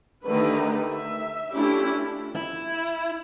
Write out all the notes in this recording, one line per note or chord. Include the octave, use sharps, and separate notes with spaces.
D3 D#3 A3 D#4 G4 B4
E5
A3 C#4 D4 E4 F4 G4
E4